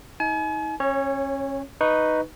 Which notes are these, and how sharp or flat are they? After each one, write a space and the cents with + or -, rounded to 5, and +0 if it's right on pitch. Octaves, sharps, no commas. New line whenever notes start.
D#4 +35 G#5 +40
C#4 -30 C#5 +0
D#4 +0 B4 +0 C#6 +0